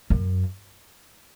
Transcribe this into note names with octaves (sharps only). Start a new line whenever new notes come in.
F#2